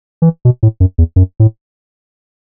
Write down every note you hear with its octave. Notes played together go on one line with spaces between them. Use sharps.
E3
B2
A2
F#2
E2
F#2
A2